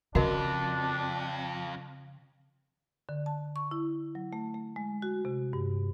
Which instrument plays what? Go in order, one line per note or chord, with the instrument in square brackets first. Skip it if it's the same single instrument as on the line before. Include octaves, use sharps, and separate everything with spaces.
[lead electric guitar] F2 G#2 [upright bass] C#3 [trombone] D4 [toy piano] F#4 A#4 D#5
[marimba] D3
A5
C#6
E4
F#3
A3
A3
G#3
F#4
C3
G2